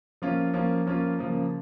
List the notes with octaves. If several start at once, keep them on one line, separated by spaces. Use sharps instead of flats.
F3 A#3 C#4 F4
F3 A#3 C#4 F4
F3 A#3 C#4 F4
C#3 F3 A#3